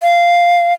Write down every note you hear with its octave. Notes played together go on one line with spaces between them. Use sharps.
F5